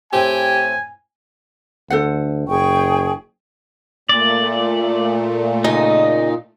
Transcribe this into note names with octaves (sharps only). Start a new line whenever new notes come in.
A2 C4 G4 G#5
D2 A4 C5 F#5
F#1 G#4 G5 C#6
A#2 A3 D5
C#3 D#4 D#5